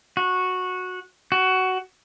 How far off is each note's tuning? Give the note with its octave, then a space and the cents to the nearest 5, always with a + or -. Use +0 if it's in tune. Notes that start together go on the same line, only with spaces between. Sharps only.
F#4 -10
F#4 +15